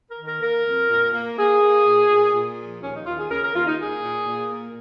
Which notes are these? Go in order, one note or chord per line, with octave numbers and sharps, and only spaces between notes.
A#4
D#3
A#4
A#3 A#4
F2
A#2
A#3
A#3 G#4
A#3
A#2
A#2
A#2
F3
D#2 C#4
D#4
D#2 F4
G#4
C#3 A#4
A#4
D#2 F4
D#4
A#3 G#4
A#2
A#2
A#3